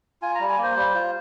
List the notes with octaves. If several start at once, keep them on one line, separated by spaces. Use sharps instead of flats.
F4 G#5
A#5
G3
G#5
A#3
C5
G3
F4